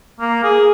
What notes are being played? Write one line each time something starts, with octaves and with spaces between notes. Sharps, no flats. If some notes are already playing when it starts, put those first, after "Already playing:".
A#3
G#4